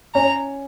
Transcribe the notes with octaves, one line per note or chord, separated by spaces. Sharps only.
C#4 A#5